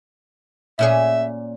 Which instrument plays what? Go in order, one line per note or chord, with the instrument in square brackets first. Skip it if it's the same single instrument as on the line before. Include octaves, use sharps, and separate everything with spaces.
[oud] A#2 C#4 G#4 [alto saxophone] E5